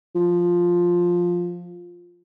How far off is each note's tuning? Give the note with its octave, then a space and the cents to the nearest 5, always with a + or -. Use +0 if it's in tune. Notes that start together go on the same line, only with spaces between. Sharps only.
F3 +5